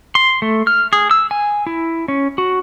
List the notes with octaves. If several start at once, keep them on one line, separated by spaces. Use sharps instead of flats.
C6
A3
F6
G#4
E6
G#5
E4
C#4
F#4